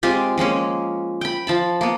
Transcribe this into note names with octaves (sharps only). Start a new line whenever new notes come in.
G#3 C4 F4 G4
F3 G#3 A#3 C#4
G5 B5
F3 A5 B5
A#3 B3